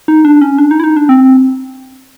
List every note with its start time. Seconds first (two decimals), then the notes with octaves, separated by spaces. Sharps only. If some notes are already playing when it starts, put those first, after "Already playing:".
0.08 D#4
0.25 D4
0.42 C#4
0.58 D4
0.71 D#4
0.80 E4
0.84 D#4
0.97 D4
1.09 C4